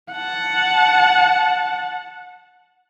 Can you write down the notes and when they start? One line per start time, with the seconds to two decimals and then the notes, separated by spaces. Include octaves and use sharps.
0.12 F#5 A5